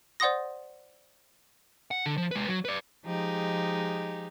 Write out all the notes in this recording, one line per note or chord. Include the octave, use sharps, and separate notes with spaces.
C5 D5 F#5 C6 D#6 A#6
F#5
D3
F3
G#3 B4
F#3
B4 D5
F3 G#3 D#4 G4